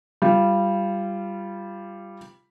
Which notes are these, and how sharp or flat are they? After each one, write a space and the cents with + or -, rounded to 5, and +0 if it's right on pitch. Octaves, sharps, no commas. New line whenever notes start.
G3 +0 F4 -20